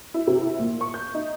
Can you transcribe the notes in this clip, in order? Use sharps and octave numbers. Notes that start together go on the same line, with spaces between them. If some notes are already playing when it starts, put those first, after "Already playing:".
E4
C3
E4
A#2
C#6
G6
D#4